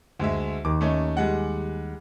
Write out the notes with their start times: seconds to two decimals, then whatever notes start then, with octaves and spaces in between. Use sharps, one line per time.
0.19 D2 G#3 E5
0.65 D#2 D#3 D6
0.81 A3 C#4 D#4
1.17 G3 G#3 F#5